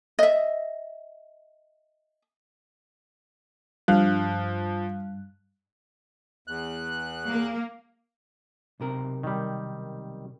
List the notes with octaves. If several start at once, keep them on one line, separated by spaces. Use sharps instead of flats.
D#5 E5
G2 F3 F5 F#6
E2 F#6
A#3
B1 C3 A#4
D#3 G3